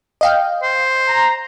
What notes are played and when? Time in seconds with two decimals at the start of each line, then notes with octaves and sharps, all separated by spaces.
0.21 D#5 F5 G5
0.63 C5
1.08 A#5